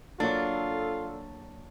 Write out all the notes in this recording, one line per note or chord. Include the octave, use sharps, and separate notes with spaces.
F#3 A#3 D4 F4 A4